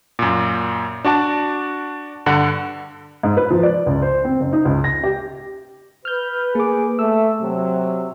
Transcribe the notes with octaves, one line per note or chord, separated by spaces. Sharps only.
F#2 A#2
D4 F#4 D5 A5
G2 D3 F#5
G#2
B4
F3
D5
C#2
C5
C4
F#1
D#4
C#2
A#6
G4
B4 F6 G6
A#3 G#4 D6
A3 E6
C3 F#3